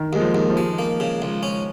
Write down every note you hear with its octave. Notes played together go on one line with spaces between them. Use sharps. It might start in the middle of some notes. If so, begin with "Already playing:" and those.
Already playing: D#3
D#2 G#3
F3
D#2
F3
G#3
A#3
C#3
C#2
C#4